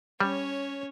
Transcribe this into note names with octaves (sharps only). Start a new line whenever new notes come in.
G3 C#4 C#5